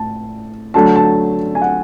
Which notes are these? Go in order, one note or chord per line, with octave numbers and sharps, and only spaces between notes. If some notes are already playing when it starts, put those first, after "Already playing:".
Already playing: A2 A5
D3 F#3 A3 A5
A5
G#5
F#5